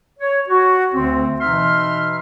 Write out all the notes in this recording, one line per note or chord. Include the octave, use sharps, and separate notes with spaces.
C#5
F#4
D2 D3 C4
B2 E3 D#4 E5 C6 F6